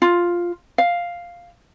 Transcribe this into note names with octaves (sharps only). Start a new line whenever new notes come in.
F4
F5